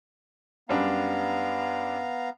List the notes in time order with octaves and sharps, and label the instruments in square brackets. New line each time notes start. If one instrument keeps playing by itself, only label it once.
[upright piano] F#2 G3 D4 [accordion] B3 F5 A#5